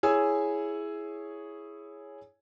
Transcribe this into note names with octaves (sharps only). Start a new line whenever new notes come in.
E4 G#4 C#5 G#5 E6